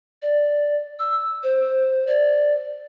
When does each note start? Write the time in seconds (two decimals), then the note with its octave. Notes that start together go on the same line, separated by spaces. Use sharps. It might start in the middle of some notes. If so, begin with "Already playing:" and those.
0.22 D5
0.99 E6
1.43 C5
2.07 D5